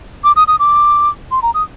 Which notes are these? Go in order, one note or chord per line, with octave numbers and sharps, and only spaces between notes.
D6
D#6
D#6
D6
C6
A#5
D#6